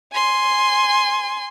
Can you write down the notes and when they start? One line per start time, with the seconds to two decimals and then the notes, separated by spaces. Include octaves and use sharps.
0.13 G#5 C6